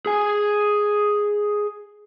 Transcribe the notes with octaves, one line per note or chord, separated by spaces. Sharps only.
G#4 G#5